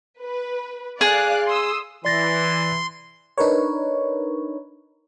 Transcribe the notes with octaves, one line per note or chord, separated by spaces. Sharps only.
B4
G#4 D5 F5 F#6
C6 D#6 E6
E3 D5 C6 A6 A#6
D4 D#4 A#4 B4 C#5